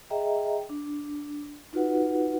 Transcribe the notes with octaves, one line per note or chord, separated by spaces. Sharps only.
G#4 D#5 E5 G5 A#5
D4
D#4 F4 F#4 B4 F#5